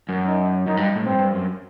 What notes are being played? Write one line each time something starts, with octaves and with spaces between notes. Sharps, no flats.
F#2
D#4
F#2 D#4
G2
A2
G2 C4
G2
F#2